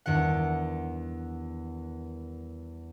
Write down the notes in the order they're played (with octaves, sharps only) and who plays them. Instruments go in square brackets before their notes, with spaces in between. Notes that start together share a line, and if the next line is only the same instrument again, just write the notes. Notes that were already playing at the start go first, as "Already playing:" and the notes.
[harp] E2 G2 D#3 F#5